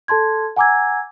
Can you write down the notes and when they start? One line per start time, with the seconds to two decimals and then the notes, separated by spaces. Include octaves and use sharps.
0.08 A4 A5 C6 G#6
0.56 F#5 G#5 A#5 D6 E6 G#6